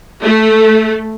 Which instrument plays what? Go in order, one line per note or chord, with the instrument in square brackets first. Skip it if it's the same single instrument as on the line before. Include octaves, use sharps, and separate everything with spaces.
[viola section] A3